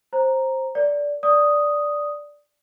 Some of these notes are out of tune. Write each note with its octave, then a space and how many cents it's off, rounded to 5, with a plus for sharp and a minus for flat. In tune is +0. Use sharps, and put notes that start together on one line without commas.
C5 +15 A#5 +0
A#4 +0 D5 -10
D5 +0 D#6 +0